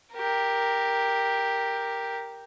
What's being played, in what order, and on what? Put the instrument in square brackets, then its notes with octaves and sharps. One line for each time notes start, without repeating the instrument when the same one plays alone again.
[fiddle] G4 A#4